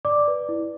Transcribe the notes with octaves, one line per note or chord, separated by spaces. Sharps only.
D5 D6
B4
E4